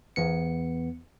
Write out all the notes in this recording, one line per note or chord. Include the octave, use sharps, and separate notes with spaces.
E2 B3 C#7